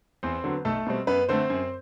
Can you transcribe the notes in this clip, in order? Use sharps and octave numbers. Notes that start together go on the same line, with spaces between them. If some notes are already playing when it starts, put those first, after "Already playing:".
E2 C4 C5
D3 F#3 B3
B1 A3 A4
B2 G3 C4
F#2 B3 B4
D3 A3 C4 C5
F#2